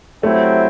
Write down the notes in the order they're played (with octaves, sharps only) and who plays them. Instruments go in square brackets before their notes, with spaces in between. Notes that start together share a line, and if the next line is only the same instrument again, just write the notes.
[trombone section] C3 F#3 C4 E4 [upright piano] A3